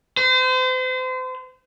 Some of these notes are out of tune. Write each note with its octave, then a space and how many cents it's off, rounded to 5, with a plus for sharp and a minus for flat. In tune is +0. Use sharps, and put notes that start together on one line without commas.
C5 -35